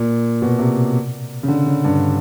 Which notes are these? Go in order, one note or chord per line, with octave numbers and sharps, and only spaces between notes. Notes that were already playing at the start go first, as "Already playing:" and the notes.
Already playing: A#2
B2
C3
C#3
D3
C#3
G2